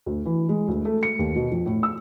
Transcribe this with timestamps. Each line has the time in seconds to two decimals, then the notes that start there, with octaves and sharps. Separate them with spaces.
0.06 D2
0.25 E3
0.49 G#3
0.68 D2
0.85 A3
1.03 C#7
1.19 D#2
1.36 B2
1.51 F2
1.66 A2
1.83 E6